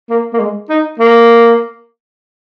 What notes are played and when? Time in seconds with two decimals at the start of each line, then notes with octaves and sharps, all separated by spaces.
0.10 A#3
0.34 A#3
0.40 G#3
0.70 D#4
1.00 A#3